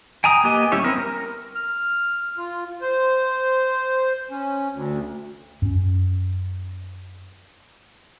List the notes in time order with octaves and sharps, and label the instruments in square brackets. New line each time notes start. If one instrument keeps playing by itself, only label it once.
[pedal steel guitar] G5 G#5 A#5 D#6
A#3 B3 G4 D#5 G#5
G3 C#4 E4 G4 C#5
B3 C4 A#4
A#4
[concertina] F6
[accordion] F4
C5
C#4
D2
[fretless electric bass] F#2 C#4